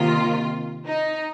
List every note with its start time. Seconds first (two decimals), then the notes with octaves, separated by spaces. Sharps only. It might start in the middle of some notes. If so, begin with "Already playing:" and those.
Already playing: C3 D#3 A#3 F4
0.86 D#4